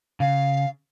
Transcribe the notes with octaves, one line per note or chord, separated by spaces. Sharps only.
C#3 F5